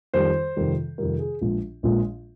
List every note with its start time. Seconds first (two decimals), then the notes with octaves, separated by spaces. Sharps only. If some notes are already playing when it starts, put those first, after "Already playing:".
0.14 F2 D#3 G3 C5
0.56 F2 C3 D#3 G3
0.98 F2 C3 D#3 G3 A#4
1.19 G#4
1.41 A#1 A#2 F3 G#3
1.83 A#1 A#2 F3 G#3